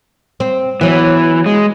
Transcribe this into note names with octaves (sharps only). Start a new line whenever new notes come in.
C4
E3 F#3 B3
G#3